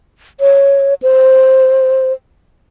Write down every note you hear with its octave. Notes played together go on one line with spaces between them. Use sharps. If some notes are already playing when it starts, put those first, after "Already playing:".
C#5
C5